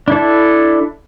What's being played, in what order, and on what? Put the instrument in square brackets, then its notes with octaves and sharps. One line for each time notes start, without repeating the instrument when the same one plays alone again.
[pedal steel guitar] D4 E4 A4